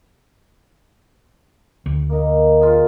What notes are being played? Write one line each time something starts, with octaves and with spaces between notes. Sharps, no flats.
D2
A#3 D#4
F4 G#4